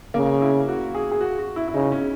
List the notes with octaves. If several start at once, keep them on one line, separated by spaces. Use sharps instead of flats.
C#3 A#3
E4
F#4
G#4
G#4
F#4
F#4
E4
E4
C#3 D#4
C#4